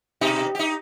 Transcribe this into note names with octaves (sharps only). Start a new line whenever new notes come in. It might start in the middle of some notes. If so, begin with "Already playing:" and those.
B2 D#4 G4
D#4 G4